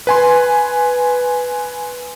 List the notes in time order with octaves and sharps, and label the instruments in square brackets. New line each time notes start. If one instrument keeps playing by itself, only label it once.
[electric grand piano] B4 G#5 C6